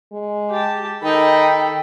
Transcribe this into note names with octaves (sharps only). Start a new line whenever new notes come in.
G#3
G4 A5
D#3 D#4 A4 G5 B5